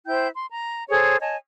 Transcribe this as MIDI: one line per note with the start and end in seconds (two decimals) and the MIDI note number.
0.07 0.27 64
0.07 0.27 72
0.07 0.27 79
0.07 0.27 91
0.36 0.45 84
0.51 0.83 82
0.89 1.17 68
0.89 1.17 69
0.89 1.17 72
0.89 1.17 73
1.21 1.36 73
1.21 1.36 75
1.21 1.36 80
1.21 1.36 81